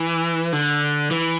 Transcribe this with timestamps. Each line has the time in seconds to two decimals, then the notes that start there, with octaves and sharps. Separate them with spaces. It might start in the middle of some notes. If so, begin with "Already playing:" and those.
Already playing: E3
0.53 D3
1.11 E3